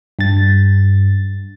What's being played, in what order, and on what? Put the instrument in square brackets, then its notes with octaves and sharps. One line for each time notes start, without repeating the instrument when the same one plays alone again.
[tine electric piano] G2 A6